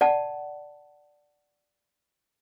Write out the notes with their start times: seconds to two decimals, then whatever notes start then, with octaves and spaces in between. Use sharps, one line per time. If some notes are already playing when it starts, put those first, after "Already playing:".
0.01 D5 F#5 A5